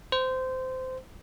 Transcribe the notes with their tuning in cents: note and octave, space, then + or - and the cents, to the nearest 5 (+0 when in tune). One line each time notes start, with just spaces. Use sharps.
C5 -20